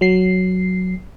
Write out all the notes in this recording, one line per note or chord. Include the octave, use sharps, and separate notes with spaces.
F#3 C7